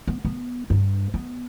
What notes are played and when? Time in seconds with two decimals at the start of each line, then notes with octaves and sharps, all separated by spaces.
0.07 B3
0.25 B3
0.70 G2
1.14 B3